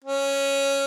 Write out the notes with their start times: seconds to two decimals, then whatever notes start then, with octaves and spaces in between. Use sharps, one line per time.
0.04 C#4